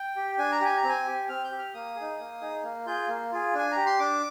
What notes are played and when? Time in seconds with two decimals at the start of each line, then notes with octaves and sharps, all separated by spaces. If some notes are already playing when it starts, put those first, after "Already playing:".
Already playing: G5
0.16 G4
0.38 D4 G#5
0.52 A#5
0.61 G4 G#5
0.77 A#5
0.84 C4
0.89 G#5
1.07 G4
1.29 C4 F6
1.44 G6
1.51 G4
1.58 F6
1.74 A#3 D#6
1.96 G#4
2.01 D#4
2.19 A#3
2.41 D#4 G#4
2.63 A#3
2.86 F4 G#4 G6
3.08 A#3
3.32 F4 G#4
3.54 D4 G#5
3.72 G4 A#5
3.86 C6
3.99 D4 D6